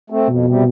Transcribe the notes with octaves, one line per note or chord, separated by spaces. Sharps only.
A3 C4
F2 B2
C3 G3